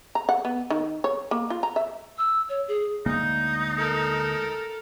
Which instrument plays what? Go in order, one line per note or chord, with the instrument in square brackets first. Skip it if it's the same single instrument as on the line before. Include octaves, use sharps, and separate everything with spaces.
[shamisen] A#5
F#5
B3
D#3
C#5
A#3
F4
A#5
E5
[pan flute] E6
C#5
G#4
[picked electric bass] D2 G#3 A#3 [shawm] D#4
[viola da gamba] A4 A#4